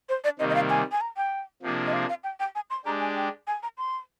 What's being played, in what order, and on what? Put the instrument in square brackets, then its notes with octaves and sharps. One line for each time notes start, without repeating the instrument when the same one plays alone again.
[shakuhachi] C5
D5
[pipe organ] C3 D#3 G3 A#3 [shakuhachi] D#5
[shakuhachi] D#5
F5
G#5
G#5
A#5
G5
[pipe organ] C3 F3 A#3 D4 G#4
[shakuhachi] D#5
F5
F5
G5
G5
G#5
C6
[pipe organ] G#3 D4 G4 [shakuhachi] A#5
[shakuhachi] G#5
G5
G#5
A#5
C6